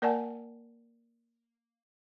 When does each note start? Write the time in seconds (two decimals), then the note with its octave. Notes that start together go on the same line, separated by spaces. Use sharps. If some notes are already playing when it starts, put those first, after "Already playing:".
0.02 A#3 A#4 D5 F#5 G#5 A5